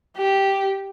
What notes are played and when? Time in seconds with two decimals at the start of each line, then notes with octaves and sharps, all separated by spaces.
0.17 G4